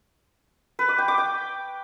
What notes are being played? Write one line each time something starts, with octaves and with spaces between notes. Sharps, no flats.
B4
D6
G5
D6
G5